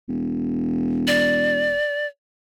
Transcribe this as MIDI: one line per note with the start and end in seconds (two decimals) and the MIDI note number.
0.09 1.79 28
1.07 2.07 74